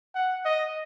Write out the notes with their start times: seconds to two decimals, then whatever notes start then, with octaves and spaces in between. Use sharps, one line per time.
0.15 F#5
0.45 D#5